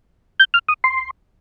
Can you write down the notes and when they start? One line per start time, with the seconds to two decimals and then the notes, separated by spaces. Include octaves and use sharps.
0.40 G6
0.54 F6
0.69 D#6
0.84 C6